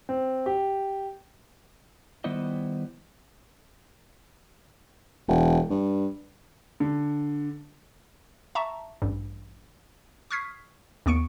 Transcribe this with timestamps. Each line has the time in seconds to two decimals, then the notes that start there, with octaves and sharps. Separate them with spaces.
0.09 C4
0.46 G4
2.24 D#3 G3 B3 E4 C5 D#5
5.29 E1
5.70 G2
6.80 D3
8.55 E5 A5 A#5 C#6
9.02 A1 G2
10.31 C#6 D#6 F6 G#6 B6 C7
11.06 D#2 B3 C#6 C#7 D7